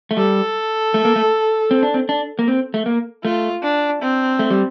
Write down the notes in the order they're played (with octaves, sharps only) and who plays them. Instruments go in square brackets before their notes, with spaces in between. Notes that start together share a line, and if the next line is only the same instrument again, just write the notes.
[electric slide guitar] A3
[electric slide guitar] G3 [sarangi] A4
[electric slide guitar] A3
A#3
A3
C4
D4
C4
D4
A#3
C4
A3
A#3
[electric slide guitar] A3 [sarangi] F4
[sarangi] D4
C4
[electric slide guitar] A3
G3